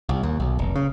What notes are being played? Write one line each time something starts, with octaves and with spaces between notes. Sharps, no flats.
C2
D#2
B1
F1
C#3